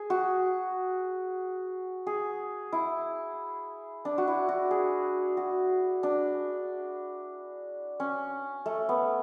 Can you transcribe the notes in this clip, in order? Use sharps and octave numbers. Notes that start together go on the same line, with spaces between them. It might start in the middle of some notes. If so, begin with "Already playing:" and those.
Already playing: G#4
F#4
G#4
E4
D4
F#4
E4
F#4
G#4
F#4
D4
C#4
A3
B3